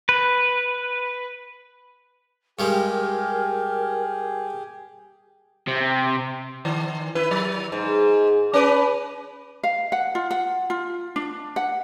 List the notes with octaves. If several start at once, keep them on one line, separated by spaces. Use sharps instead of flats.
B4
G2 G3 G#3 G4 G#4 A#4
C3
D#3
E4 B4
F#3
G#2
C#4 B4
F5
F#5
F4
F#5
F4
D4
F#5